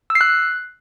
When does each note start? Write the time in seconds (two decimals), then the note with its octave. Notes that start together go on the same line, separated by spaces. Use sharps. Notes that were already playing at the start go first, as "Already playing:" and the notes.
0.10 E6
0.15 C7
0.21 F#6